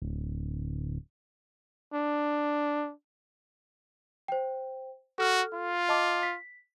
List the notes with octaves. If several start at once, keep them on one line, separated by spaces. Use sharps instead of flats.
D1
D4
C5 G5
F#4 A4 F6
F4
D#5 A5 D6
B6